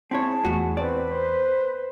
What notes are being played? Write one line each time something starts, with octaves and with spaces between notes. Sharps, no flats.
C4 E4 G#4 C#5 A5
E2 A2 F4 F#4
C4 B4 D5
C5